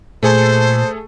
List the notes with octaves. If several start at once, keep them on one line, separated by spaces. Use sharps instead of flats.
A#2 A3 G#4 A4 C5